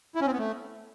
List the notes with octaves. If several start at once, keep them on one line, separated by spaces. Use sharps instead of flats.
E4
C#4
C4
B3
A3